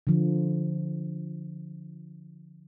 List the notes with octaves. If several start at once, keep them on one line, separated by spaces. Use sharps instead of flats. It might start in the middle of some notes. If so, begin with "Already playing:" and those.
D3 F3